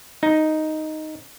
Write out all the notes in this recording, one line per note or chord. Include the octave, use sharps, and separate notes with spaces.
D#4